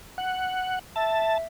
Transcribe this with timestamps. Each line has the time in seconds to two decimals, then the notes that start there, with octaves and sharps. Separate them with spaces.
0.18 F#5
0.96 E5 A5